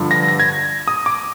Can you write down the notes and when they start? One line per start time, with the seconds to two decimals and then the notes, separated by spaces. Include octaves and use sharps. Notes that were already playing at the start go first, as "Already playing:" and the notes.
Already playing: G2 D3 F3
0.11 A#6
0.28 A#6
0.40 G#6
0.88 D#6
1.06 D6